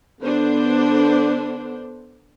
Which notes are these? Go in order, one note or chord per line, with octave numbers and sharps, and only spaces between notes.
D3 B3 D4 C5